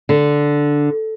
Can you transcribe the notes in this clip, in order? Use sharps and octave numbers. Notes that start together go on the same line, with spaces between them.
D3